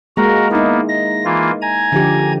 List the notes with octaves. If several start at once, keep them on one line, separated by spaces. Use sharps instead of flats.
G#3 A#3 F#4 A#4 A#5
A#3 B3 D#4 E4
A#6
E3 A#3 F4
G#5 A#5 G#6
D3 F3 G4